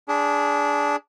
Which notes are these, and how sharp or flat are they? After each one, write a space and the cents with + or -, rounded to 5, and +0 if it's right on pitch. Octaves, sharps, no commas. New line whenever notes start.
D4 -15 G#4 +0 B5 +0